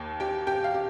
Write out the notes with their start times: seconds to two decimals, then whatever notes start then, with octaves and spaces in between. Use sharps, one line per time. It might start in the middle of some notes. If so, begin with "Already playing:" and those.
Already playing: D#2 A#3
0.20 G4 G5
0.47 G4 G5
0.64 F5
0.74 G4